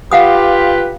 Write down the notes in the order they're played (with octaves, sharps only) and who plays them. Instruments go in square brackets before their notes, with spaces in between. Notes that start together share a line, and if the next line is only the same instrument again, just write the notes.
[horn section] F4 G4 B4 [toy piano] F5 F#5 D#6